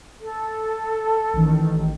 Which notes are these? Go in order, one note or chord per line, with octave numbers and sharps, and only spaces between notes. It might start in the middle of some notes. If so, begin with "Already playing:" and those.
A4
A1 D#3